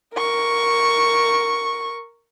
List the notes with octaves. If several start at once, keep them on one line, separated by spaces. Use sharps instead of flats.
A#4 C#6